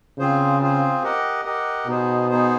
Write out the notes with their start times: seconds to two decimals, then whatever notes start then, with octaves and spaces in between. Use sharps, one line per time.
0.18 C#3 C4 F4 G#4 C5
0.60 C4 F4 G#4 C5
1.03 G4 A#4 D#5 F#5
1.45 G4 A#4 D#5 F#5
1.87 B2 B3 D#4 G#4 C5
2.29 B3 D#4 G#4 C5